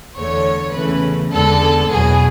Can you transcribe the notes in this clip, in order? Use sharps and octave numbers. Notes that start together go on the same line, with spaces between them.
E2 D3 A3 C#5
E2 C#3 E3 A3 B4
E2 D3 G#3 B3 A4
E2 B2 F#3 G#4